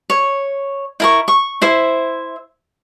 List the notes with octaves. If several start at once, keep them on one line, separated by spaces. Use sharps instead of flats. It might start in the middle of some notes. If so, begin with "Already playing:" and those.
C#5
E4 A#4 C#6
C#6
E4 C5 E5